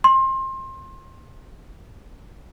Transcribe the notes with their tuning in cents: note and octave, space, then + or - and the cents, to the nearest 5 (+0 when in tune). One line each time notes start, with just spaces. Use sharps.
C6 +25